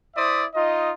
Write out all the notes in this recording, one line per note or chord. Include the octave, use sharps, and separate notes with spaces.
E4 C5 D5 E5 D#6
D#4 F4 D#5